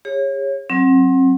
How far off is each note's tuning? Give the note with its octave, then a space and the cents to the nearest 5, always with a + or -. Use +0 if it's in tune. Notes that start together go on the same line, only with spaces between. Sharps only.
G#4 -45 C#5 -15
F#3 +0 C4 +30